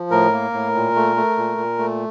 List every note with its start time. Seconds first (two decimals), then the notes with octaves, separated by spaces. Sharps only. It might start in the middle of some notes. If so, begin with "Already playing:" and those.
Already playing: F3
0.11 A2 A#4
0.33 A#3
0.53 A2
0.74 A#2
0.96 A3
1.16 A3
1.37 A#2
1.57 A#2
1.79 A3